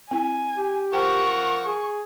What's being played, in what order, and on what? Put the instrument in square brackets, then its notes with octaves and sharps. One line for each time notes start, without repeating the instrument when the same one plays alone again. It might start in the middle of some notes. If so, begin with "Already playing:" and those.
[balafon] C4 E4 [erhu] G#5
[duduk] G4
[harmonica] F3 A#4 F#5 [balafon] C5 G5 [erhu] C#6
[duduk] G#4